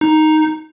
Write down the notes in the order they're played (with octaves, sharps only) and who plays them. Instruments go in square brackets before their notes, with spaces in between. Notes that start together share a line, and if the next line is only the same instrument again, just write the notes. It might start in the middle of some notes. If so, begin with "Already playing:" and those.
[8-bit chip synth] D#4